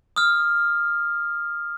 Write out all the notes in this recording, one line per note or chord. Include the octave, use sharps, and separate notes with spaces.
D#6 F6